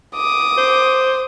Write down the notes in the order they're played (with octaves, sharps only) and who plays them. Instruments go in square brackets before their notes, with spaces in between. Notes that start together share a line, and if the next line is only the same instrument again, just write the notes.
[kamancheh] D6 D#6
[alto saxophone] C5